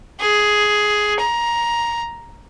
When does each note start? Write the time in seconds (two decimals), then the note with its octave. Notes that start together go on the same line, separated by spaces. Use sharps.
0.20 G#4
1.19 A#5